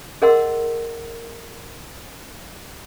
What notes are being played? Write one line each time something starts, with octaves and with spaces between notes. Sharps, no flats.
G#4 A#4 D#5 F#5 C6 E6